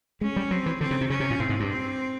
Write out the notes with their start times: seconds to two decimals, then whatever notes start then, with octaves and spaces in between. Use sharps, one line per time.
0.21 G#3 C#4
0.36 G3
0.51 F#3 C4
0.66 E3
0.81 D3 C4
0.91 C#3
1.01 C3
1.10 C#3 C#4
1.20 C3
1.31 A#2
1.40 A2 C4
1.49 G#2
1.60 G2
1.70 C4